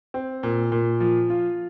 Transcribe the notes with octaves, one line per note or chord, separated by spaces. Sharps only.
C4
A#2
A#2
F3
F4